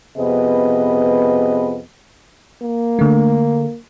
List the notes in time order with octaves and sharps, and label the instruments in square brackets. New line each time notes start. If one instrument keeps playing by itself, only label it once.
[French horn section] F2 C3 B3 G#4 B4 D#5
[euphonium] A#3
[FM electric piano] D3 A3